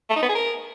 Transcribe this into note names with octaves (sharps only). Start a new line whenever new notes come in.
A3
D#4
B3
G#4
A#4